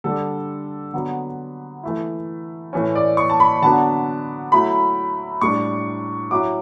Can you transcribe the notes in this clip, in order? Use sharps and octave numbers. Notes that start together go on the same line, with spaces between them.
D3 G3 D4 A4
D3 F#3 B3
E3 A3 E4
A2 E3 A3 C#4
D5
C#6
A5
B5
D3 F#3 B3 D4 A5
F#3 A3 E4 B5
A2 G3 D4 C#6
F#3 C#4 E4 D6